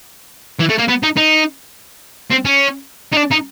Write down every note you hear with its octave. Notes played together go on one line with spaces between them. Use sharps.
E3
A3
A#3
B3
D#4
D#4
C4
C#4
D#4
D4
D#4